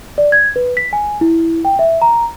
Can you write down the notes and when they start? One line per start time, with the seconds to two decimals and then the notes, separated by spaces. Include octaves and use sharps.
0.18 D5
0.32 G#6
0.56 B4
0.77 B6
0.93 G#5
1.21 E4
1.65 G5
1.79 E5
2.02 A#5